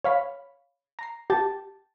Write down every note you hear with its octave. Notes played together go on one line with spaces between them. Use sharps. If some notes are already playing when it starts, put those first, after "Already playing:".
C#5 F5 B5
A#5 C7
G4 G5 A5 A6